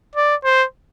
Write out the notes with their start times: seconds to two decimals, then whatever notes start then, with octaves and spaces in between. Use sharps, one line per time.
0.16 D5
0.44 C5